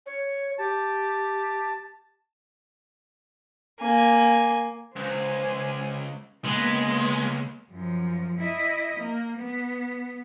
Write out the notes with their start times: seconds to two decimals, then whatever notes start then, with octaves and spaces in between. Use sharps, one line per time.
0.06 C#5
0.58 G4 A5
3.82 A#3 G#5
4.96 C#2 C5 G#5
6.45 C#2 G#3 A#3 B3 B4
7.71 F#2 F3
8.38 E4 D#5
8.99 A#3
9.37 B3